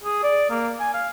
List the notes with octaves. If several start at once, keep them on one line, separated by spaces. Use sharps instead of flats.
G#4
D5
A#3
G#5
F5